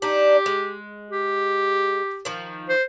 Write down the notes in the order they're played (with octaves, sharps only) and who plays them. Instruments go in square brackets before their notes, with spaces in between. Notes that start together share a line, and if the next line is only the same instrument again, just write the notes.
[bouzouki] D4 D#4 [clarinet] G4
[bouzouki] G#3
[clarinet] G4
[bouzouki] D#3 F3
[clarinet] C5